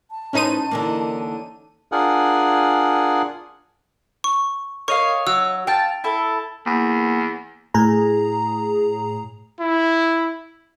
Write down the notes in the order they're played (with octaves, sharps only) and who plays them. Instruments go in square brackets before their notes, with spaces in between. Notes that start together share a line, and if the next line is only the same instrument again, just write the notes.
[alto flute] A5
[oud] A2 B4 C5 [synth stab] C#4 D#4 D#7
[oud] D3 E3 A#3
[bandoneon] D4 F4 G#4 A#4 F#5 G#5
[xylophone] C#6
[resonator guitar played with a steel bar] A#4 [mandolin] C#5 D#5 F5 [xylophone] C#6
[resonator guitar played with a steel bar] F#3 [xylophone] E6
[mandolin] F5 A5 [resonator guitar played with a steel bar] G5
[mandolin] E4 A4
[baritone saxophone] E2 [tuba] A#3
[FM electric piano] A2 G#4 A#5
[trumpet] E4